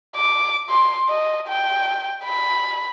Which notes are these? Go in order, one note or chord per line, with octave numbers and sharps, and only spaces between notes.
D6
C6
D#5
G5
B5